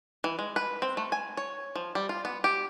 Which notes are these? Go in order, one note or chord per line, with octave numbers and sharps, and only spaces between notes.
E3
G#3
B4
C4
A3
G#5
C#5
F3
G3
F4
B3
G4